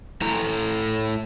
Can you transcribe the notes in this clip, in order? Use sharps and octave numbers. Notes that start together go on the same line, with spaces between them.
A3 E4 A4 A#5